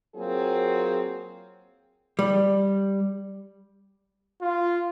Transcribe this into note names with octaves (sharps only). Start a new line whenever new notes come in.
F#3 A#3 C4 F4 G#4
G3
F4